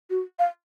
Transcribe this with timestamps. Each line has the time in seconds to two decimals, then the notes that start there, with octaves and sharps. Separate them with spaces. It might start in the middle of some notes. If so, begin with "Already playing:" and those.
0.10 F#4
0.39 F5